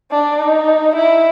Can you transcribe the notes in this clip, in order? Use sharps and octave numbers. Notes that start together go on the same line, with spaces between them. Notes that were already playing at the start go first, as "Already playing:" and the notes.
D4
D#4
E4